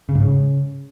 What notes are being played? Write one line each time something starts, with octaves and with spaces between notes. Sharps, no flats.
C#3
G#2
C#3